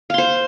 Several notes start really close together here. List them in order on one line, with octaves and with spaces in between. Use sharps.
F5 C6 C5